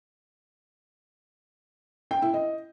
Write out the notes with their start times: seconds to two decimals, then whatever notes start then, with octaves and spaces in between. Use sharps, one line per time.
2.11 G5
2.22 E4
2.34 D#5